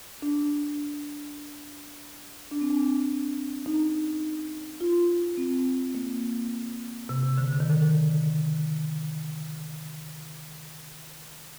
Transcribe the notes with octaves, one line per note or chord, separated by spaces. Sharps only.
D4
D4
C4
D4
D#4
F4
C4
A#3
C3
C3
D3
D3
D#3
D3